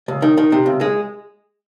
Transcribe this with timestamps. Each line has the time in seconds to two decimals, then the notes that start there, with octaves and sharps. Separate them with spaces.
0.08 C#2
0.22 D#3
0.37 D#3
0.52 C3
0.66 C#2
0.81 G#3